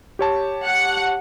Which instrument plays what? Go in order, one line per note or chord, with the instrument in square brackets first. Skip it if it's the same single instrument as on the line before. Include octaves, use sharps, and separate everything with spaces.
[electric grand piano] G4 C#5 A5
[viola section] F#5